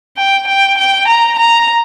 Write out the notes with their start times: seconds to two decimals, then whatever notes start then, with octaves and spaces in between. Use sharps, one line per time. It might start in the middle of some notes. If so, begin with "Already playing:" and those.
0.17 G5
0.48 G5
0.78 G5
1.08 A#5
1.39 A#5